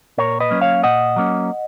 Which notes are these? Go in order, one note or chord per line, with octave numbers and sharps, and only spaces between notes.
A#2 A#4 C#5
B4 D#5
F#3 A#3 C#4
C#5 F5
A#2 D#5 F#5
F#3 A#3 C#4